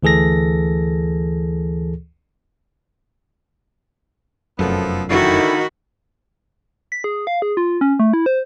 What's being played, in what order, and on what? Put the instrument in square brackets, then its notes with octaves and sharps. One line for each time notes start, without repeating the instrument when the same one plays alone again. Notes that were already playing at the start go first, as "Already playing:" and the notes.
[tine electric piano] D2 E3 G#4 A4 A#6
[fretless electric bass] F1 F#2 [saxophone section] F3 B3 A4
[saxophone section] D3 E4 [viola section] D#3 B5 [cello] F#4
[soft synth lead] B6
G#4
F5
G#4
F4
C#4
A3
E4
C5